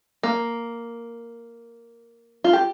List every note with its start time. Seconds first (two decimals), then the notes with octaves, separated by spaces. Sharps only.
0.23 A#3
2.44 F4
2.53 G4